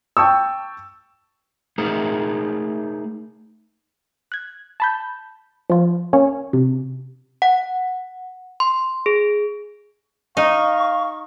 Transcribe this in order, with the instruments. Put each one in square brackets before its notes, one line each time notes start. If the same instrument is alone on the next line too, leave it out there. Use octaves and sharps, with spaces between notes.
[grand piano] G5 A5 C#6 E6
[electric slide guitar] A3 D#4 G#4 A#4
[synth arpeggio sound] F#6 G#6
A5 B5 G6
F3 F4
A#3 C#4 C#5
C3
[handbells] F#5
C6
G#4
[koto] D#4 [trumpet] F5 [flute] C#6